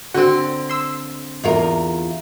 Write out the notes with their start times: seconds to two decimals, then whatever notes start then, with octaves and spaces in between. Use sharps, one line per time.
0.14 D3 C4 F#4
0.70 C6 E6
1.44 E2 F4 A#4